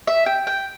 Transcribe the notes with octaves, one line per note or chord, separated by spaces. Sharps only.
E5
G5
G5